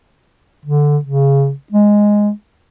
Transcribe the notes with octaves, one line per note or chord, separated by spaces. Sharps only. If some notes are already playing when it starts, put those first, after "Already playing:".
D3
C#3
G#3